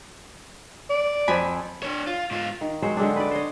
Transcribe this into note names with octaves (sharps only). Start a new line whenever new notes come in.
D5
F2 G#5 B5
D4 C#5
F4
G#2 F4
D#3
F#3 G#3 C5
D3 G#3 C4 D4
B4 D5
C5 C#5 D#5